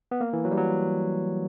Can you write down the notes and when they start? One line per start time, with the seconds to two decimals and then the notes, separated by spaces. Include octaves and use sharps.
0.11 B3
0.21 A#3
0.33 E3
0.45 F#3
0.51 G3
0.58 F#3